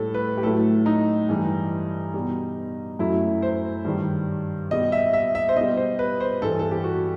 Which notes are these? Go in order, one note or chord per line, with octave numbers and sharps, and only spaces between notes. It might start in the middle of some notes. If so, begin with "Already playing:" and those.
Already playing: A2 G3 A4
B4
G4
A2 F#3 A3 A4
D#4
G2 E3 G3
B2 G3
F#2 F#3 A3 E4
C5
G2 D#3 G3
B2 G3 D#5
E5
E5
E5
C5
B2 G3 D#5
C5
B4
C5
G2 E3 G3 A4
A4
G4
F#4